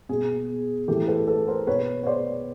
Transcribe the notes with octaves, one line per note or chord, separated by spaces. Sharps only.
B2 G#4
A2 E3 G4 A4
A4 B4
A4 B4
A#4 C5
B2 B4 C#5
C#5
C5 D5